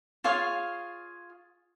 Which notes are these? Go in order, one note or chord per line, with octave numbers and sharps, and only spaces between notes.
F4 G#4 C#5 F5